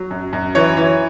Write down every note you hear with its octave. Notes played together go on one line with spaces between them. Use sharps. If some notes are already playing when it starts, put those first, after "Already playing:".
Already playing: F#3
F#2
F#2
E3 C#5
E3